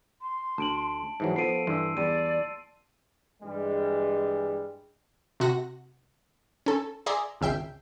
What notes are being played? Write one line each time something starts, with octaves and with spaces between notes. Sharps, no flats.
C6
D2 A5 D7 F#7
G#2 E3 F#3
F3 B3 A4 C7 D7 D#7
G2 E3 C6 E6
E2 G3 D5 D#7
G2 E3 G3 G#3
C3 F#4 A#6
C#4 A4
G#4 D5 E5 A#5 C6
G#1 C#2 E5 G5 C7